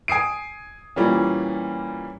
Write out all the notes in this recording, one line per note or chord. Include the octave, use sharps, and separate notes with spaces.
G#5 D#6 C7 D7
A#2 E3 G3 A#3 C#4